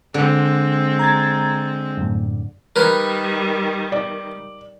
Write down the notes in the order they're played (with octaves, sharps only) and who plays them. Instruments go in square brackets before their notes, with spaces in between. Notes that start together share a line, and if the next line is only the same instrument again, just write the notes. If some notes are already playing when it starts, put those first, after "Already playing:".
[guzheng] D3 [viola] G#3 C4
[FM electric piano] A#5 G#6 A6
F#2 A2
[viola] D#3 G3 [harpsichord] A#4 B4
[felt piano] D5